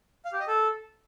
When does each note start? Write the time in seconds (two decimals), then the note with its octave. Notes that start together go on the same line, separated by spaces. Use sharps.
0.25 F5
0.32 G4
0.40 D#5
0.47 A4